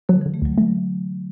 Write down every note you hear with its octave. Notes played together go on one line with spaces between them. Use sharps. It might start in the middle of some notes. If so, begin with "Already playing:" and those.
D3 F#3
D3 E3
A3
D2 F#3
F#3 A3